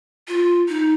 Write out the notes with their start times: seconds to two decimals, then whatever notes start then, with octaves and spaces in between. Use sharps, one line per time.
0.28 F4
0.68 D#4